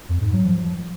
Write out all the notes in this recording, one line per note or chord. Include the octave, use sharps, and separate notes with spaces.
F2
G#2
F#3
F3